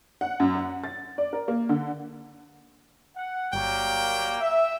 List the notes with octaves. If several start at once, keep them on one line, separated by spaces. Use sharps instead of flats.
F#5
F#2
F#5
A6
D5
A#4
A#3
D3
F#5
G1 F#3 G3 A#3 G5
E5